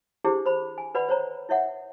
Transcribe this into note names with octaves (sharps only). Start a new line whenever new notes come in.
D4 E4 G4 G#4 C5
C5 B5
G#5
B4 D5 F#5 B5
C5 C#5 A#5
E4 C#5 E5 F#5